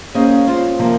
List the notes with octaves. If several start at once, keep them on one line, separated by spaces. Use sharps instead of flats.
A#3 C#4 G#4 C5 D#5
C4 F4 C5
C3 F3 A#3